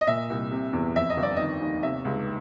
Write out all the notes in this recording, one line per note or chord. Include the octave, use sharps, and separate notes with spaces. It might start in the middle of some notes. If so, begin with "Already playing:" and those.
D#5
A#2 E5
C2
C3
E2
F2 E5
D#5
G1
D5
D#3 D#5
D#2
C3 E5
C#2